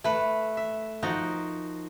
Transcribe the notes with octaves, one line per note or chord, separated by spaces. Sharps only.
A3 B4
E5
F3 D#4 F#4 A#4